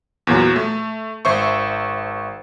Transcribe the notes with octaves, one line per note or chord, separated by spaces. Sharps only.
E2 A#2 F#3
A3
G#1 C5 E5 C#6